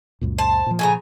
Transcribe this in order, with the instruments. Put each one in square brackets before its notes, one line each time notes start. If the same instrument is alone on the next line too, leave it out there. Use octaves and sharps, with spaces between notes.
[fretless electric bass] C#2 F#2 A#2
[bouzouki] C5 A5
[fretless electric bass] A#2 F3
[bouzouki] A2 C#3 A#5 [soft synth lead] G#5